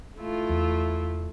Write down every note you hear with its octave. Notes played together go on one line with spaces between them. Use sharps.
A3 E4 F4
E2